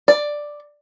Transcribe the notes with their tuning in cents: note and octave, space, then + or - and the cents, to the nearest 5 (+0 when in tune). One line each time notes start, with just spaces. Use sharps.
D5 +5